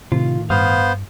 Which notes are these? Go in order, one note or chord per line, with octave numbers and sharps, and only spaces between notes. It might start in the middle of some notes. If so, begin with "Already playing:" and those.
A2 C3 D#3 F4
G2 B3 C5 F5 D#6 F6